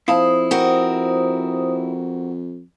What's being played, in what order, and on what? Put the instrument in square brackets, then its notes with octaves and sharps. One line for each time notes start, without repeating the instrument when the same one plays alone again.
[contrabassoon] F2 [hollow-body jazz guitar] E4 F5 A5 [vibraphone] C5 D#6
[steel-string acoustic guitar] C4 F#4 A#4